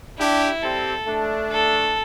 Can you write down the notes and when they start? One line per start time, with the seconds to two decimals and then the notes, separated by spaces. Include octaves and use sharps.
0.18 D4 E4 G4
0.63 G3 C4 A4
1.07 A3 D4
1.52 A4